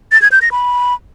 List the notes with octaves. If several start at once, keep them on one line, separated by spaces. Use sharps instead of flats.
A6
G#6
G6
A#6
B5